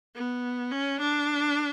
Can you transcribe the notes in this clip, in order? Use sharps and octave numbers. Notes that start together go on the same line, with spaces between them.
B3
C#4
D4